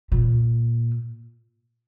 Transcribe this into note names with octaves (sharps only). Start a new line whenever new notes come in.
A#2